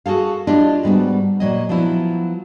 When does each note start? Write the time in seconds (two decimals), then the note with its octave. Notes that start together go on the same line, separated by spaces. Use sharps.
0.06 F#4 G#4 A4 F5
0.47 D4 E4 F4 G4 D#5
0.83 G#2 G3 B3 F#4
1.40 A#2 F#3 D#5
1.69 F3 F#3 B3 E4